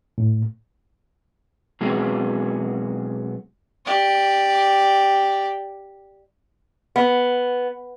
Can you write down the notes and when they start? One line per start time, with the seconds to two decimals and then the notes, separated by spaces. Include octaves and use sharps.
0.18 A2
1.81 B2 F#3 G#3 B3 C4 G#4
3.85 G4 D5
6.96 B3